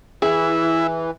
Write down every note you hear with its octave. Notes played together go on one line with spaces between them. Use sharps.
E3 E4 G#4